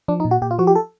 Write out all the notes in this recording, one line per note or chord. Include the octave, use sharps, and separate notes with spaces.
F3 D4
D#4
A#2
F#4
A#2 G4
F4
F3 F#4
G4
A4